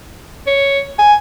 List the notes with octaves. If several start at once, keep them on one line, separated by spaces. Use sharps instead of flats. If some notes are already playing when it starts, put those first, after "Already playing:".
C#5
G#5